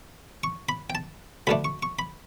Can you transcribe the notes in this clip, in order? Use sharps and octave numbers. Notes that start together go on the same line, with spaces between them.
C#6
B5
G5
A5
D2 D3 A3 D4 B5
C#6
C#6
B5